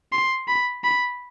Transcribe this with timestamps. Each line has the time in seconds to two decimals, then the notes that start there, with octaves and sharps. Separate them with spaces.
0.12 C6
0.48 B5
0.84 B5